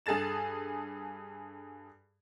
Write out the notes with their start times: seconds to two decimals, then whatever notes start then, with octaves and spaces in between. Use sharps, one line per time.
0.06 G2 G#4 A4 A6 E7